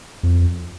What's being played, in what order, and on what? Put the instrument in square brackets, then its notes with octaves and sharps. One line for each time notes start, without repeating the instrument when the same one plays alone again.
[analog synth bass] F2